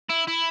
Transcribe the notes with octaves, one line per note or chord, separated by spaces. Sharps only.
E4
E4